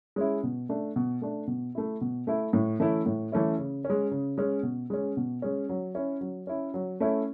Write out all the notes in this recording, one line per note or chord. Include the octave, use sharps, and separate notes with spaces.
G#3 C#4 E4
B2
A3 D4
B2
A3 D4
B2
A3 E4
B2
A3 E4
A2
E3 A3 C#4 E4
A2
E3 A3 C#4 E4
C#3
C#4
G#3
C#3
G#3 C#4
B2
G#3 C#4
B2
G#3 C#4
F#3
C#4 E4
F#3
C#4 E4
F#3
A3 C#4 E4